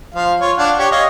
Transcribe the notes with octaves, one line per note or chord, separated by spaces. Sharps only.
F3 F5
F4 C#5
D4 F5 F#5
G4 C#5 C#6
C#5 D#5 F5